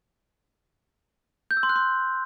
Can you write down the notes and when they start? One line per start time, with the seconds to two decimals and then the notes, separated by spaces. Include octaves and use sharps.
1.51 G6
1.57 E6
1.63 C6
1.69 F#6
1.76 C6